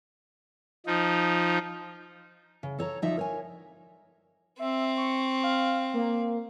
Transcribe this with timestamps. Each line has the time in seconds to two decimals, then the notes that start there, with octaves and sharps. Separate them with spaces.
0.86 F3 D#4
2.63 C#3
2.79 A4 C#5 A#5
3.02 D2 F3 D#4 D5 E5
3.17 A#4 C#5 G#5
4.59 C4 E5
4.97 C#6
5.44 F5
5.94 A#3